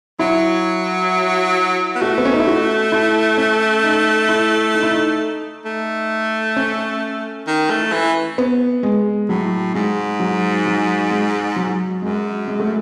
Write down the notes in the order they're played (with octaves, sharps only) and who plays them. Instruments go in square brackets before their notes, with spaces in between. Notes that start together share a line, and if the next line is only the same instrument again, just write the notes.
[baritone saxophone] F#3 [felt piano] E4
[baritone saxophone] B3
[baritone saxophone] A3 [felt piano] F#4
[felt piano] B3
C#4
D#4
E4
F#4
E4
C#4
D#4
E4
D#4
E4
D#4
[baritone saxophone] A3
[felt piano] C#4
[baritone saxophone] D#3
A3
E3
[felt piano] B3
G#3
[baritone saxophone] A2 [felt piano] F#3
[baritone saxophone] G#2 [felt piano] G#3
[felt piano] F#3
F#3
G#3
F#3
[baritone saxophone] F#2 [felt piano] G#3
[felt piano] G#3
A3